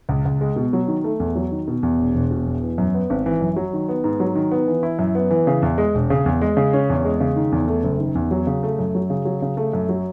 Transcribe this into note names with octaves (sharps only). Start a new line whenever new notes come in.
C#2
C#2
G#3
B2
F#3
D#3
A3
E2
F#3
D#3
B2
E2
E1
E1
B2
E2
E3
F#2
B3
G#1
E3
F#2
F#3
D#3
B3
G#2
F#3
D#3
B3
E3
E4
F#2
B3
E3
C#3
E2
G#3
E1
C#3
E2
G#3
C#3
C#4
E2
G#3
C#3
D#3
E2
A3
F#1
D#3
E2
F#3
C#3
A3
F#2
F#3
C#3
F#3
C#3
A3
F#2
F#3